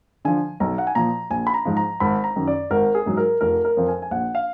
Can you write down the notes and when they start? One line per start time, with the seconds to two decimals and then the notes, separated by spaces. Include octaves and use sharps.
0.25 D3 F3 G#5
0.60 B1 A#5
0.78 F#5
0.87 G#5
0.95 A#2 F3 A#5
1.30 A#1 G#5
1.47 B5
1.54 A#5
1.65 G#2 F3
1.77 A#5
2.00 G#1 B5
2.24 A#5
2.36 F#2 D#3
2.47 D5
2.70 G#1 A#4
2.95 G#4
3.06 G#2 F#3
3.17 A#4
3.41 F1 A#4
3.65 A#4
3.77 F2 F3
3.88 G#5
4.02 G#5
4.11 A#1 F#5
4.35 F5